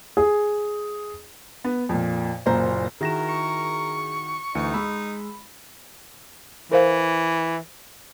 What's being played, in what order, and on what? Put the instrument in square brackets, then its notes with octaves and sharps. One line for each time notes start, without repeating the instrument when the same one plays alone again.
[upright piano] G#4
[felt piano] B3
F2 A#2
F#1 A#2 C5 A#5
[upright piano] D#3 E4 F#4 [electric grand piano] G#4 A#6 E7 [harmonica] A#4
[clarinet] C#6
[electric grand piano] D2 E3 C#7 [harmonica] D#4
[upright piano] G#3 E6 [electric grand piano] B5
[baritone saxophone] E3 [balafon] A#4 C5 F5